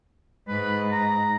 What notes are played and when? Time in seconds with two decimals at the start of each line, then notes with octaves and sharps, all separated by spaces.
0.48 G#2 B4
0.92 A#5